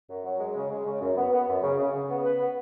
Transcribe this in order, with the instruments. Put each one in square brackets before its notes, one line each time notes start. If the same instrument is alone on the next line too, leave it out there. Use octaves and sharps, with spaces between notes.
[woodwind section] F#2
F#3
G#3
C#3
G#3
C#3
F#2
B3
B3
F#2
C#3
C#3
C#3
B3
B4
B3